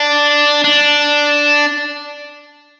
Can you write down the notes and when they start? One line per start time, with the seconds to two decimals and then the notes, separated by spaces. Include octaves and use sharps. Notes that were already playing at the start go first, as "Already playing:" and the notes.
Already playing: D4
0.64 D4